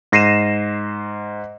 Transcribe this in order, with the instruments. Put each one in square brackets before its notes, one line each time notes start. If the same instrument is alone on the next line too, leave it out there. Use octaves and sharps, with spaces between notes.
[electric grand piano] G#2 A#6 C7 D#7 E7